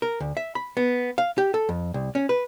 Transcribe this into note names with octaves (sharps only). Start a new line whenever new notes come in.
A#4
D2
E5
B5
B3
F5
G4
A4
F2
C2
C#4
B4